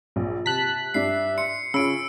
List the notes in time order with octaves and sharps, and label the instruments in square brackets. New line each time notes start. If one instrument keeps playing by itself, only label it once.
[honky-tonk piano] A#1
[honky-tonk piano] C3 [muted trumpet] A5 [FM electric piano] F#6 B6
[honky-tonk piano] G2 D4 [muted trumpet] E5 [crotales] C7
[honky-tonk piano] C6 [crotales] C#7
[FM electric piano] C#3 [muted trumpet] C#4 [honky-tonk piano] F4 B5 [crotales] E6 D7